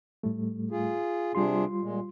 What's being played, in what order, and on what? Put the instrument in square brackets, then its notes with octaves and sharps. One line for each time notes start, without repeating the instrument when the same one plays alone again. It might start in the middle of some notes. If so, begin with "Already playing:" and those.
[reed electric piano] A2 G3 A3
[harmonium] F4 G#4
[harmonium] C3 D4 G#4 [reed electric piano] G3 F4 C6
[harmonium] A#2 G#3